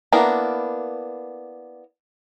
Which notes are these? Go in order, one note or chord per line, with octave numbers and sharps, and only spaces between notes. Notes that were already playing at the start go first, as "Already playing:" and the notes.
A#3 B3 D4 E4 A#4